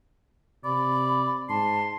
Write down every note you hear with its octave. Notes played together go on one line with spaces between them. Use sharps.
C3 D5 B5
G#2 A5 C6